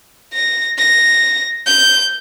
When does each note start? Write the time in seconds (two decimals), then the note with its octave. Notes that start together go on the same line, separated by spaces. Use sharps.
0.34 A#6
0.78 A#6
1.66 G6